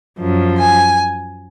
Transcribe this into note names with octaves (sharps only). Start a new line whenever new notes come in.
F#2 F3
G#5